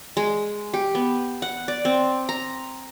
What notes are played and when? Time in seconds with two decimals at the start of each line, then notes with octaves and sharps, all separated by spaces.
0.17 G#3
0.74 G4
0.95 B3
1.42 F#5
1.68 D5
1.85 C4
2.29 A#5